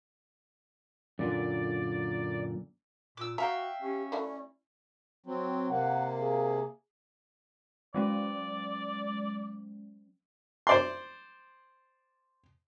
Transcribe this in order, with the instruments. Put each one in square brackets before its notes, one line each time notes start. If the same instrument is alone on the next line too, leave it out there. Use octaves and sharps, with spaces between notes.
[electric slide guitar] F#2 A#2 D3 [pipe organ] D5
[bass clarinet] A#2 [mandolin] D6 E6
[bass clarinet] F#4 [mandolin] E5 F5 G5 [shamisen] A#5
[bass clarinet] C#4 [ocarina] G4
[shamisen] A3 E4 F#4 [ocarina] D5
[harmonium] F#3 C4
[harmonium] C3 A#3 [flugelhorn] F#5
[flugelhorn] G#4
[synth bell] F#3 G#3 C#4 [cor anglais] D5
[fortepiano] C5 D5 C6